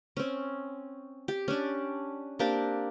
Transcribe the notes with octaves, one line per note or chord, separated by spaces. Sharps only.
C4 C#4
G4
C#4 D4
A#3 C4 D4 G4